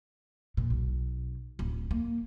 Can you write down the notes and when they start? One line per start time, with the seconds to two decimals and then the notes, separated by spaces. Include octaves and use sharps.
0.57 A#2
0.70 B1
1.59 D1
1.91 A#3